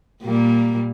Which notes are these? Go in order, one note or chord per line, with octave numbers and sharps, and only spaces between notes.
A#2 G3 A#3